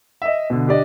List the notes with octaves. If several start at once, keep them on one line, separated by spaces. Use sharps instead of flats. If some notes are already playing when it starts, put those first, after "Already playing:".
D#5 E5
B2 D3
D4 G4 D5 D#5